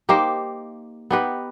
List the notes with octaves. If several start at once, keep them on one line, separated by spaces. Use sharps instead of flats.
A#3 D#4 G4 C5
B3 D#4 G4 B4